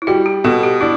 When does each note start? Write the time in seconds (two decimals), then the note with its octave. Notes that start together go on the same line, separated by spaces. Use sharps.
0.02 E4
0.07 G3 F#4
0.26 G4
0.44 B2 A4
0.63 G4
0.81 D4 E4